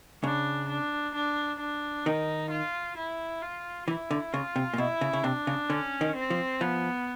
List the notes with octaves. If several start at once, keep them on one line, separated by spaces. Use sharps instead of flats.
C#3 D4
D4
D4
D4
D#3 D#4
F4
E4
F4
E3 E4
D3
C#3 F4
C3
A#2
B2 E4
C#3
C#3
C3 D4
C#3
D3 C#4
D#3
C4
F3
F3 B3